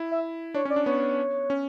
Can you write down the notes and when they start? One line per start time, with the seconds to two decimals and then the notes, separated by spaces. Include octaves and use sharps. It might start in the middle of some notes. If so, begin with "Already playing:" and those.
Already playing: E4
0.12 E5
0.54 D4 C#5
0.65 C#4
0.70 D5
0.76 D4
0.86 B3 C#5
1.50 C#4